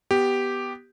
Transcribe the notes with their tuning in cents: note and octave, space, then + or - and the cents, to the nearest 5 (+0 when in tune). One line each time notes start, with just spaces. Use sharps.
B3 +0 G4 +0